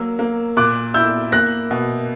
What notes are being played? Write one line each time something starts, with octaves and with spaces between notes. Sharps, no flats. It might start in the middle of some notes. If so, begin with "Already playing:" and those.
Already playing: F#3 A#3 E6
A#3
A#2 D6 F#6
E4 E6 G6
A#3 F#6 A#6
B2